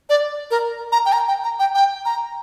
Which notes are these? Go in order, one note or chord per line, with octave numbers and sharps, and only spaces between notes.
D5
A#4
A#5
G5
A#5
G5
A#5
G5
G5
A#5